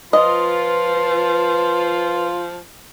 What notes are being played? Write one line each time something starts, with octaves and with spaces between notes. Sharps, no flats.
F3 F4 B4 D#5 C6